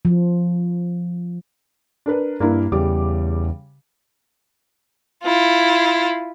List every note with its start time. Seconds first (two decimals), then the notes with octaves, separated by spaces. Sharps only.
0.05 F3
2.06 D4 A#4 B4
2.40 G2 A#3 D4 E4
2.72 E2 C#3 G3 D6
5.24 E4 F4